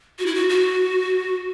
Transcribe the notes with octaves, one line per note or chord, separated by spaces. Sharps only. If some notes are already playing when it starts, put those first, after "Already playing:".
F#4
E4
F#4
F#4